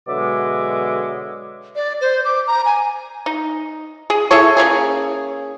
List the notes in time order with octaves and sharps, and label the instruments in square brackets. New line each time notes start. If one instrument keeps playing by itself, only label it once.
[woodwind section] B2 D3 F#3 G#3 E5 D6
[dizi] D5
C5
D6
A#5
G#5
[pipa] D#4
G#4
E4 G#4 A4 C#5
C#3 G3 A#3 G#4